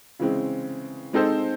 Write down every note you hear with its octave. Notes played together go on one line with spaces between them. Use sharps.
C#3 E3 G#3 C4
G#3 C4 D#4 A4 C5